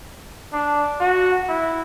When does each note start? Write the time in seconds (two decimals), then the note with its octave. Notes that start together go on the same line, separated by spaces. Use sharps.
0.53 D4
1.00 F#4
1.49 E4